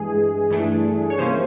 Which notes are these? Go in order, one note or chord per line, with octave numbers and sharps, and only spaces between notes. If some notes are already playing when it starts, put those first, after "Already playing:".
Already playing: G2 E3 G#3 G#4
G2 E3 A3 D4
C#5
C3 F3 A#3 C#4 C5